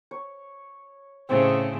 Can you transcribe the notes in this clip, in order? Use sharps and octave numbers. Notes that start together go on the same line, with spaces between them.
C#5
A2 C#3 C4 G#4 D#6